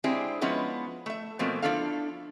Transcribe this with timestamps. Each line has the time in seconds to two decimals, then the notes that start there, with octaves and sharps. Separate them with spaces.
0.04 G#3 C4 D4 E4 G4 G#4
0.41 F3 G#3 B3 C#4 E4 B4
1.06 A3 E5
1.39 B2 E3 F3 A3 A#3 C4
1.62 F3 C4 D4 E4 A4 F5